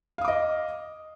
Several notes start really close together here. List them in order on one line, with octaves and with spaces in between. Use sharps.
F5 D#6 D6 D#5